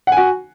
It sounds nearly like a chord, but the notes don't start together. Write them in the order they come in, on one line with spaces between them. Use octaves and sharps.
F#5 G#5 F#4